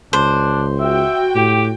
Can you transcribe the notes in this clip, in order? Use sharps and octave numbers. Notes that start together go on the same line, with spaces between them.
C#2 D4 C5
F#4 E5 G5
A2 G4